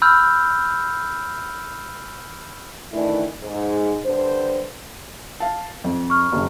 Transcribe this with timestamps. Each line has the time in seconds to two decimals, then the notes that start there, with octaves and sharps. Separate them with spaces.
0.02 B5 E6 F6 G6
2.93 D#3 E3 A3 D4 E4
3.42 G#2
4.05 G2 D3 C5
5.40 F5 A5
5.84 F2
6.10 C#6 F6
6.32 F#1 C#3